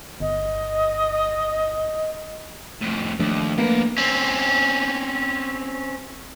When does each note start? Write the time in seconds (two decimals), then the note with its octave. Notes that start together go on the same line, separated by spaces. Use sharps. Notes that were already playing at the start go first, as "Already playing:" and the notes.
0.20 G1 D#5
2.82 F2 A2
3.19 D#2 F3 A3 D4
3.58 A#3 B3 A#4 B4
3.98 C4 C#4